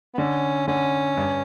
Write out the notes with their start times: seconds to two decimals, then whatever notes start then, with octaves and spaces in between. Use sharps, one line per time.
0.14 B3
0.18 D3 C#4
0.67 D3 C#4
1.17 G2